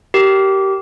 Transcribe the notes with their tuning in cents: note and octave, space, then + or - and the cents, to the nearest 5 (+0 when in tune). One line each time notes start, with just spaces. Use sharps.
G4 -20 A#4 +0